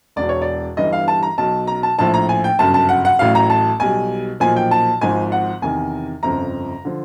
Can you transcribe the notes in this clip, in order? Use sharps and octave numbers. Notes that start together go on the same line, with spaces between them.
E1 E2 B2 D5
C#5
D5
G1 G2 E3 G3 D#5
F5
A5
A#5
B1 B2 F#3 A5
A#5
A5
A#1 A2 F3 A5
A#5
G#5
G5
G1 F#2 C#3 A5
A5
F#5
F#5
A1 A2 F#3 F5
A#5
A5
B1 B2 G3 G#5
B1 A#2 F3 G#5
G5
A5
G#1 G#2 F3 G#5
F#5
E2 C3 D#3 G#5
G1 F2 C#3 F3 A#5
D3 F3